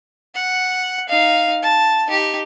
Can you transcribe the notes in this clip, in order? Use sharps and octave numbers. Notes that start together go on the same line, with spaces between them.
F#5
D#4 F5
A5
D#4 G4